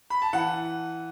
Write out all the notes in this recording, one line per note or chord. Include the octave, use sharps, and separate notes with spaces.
B5
A5
E3 F#5